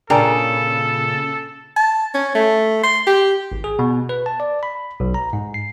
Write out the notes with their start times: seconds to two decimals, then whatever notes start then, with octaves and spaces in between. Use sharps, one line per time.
0.10 A#2 C#3 D4 A4 A#4 G5
1.76 A5
2.15 C#4
2.35 A3
2.83 C6
3.07 G4
3.52 G#1
3.64 G#4
3.79 B2
4.09 B4
4.26 A5
4.40 D5
4.63 B5
5.00 B1
5.14 A#5
5.33 G#2
5.54 C7